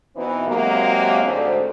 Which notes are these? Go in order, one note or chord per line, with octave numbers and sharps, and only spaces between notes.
B2 E3 B3 C4 D#4 E4
C3 F#3 G#3 A#3
D2 G#2 D3 C4 D4